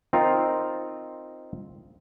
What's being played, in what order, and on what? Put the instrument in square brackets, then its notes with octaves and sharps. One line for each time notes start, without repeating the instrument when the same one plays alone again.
[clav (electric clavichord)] C4 D#4 F4 A#4